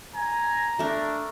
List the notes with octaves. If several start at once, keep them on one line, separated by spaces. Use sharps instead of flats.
G#5 A#5
A3 D4 A#4